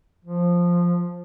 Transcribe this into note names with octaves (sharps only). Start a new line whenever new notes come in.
F3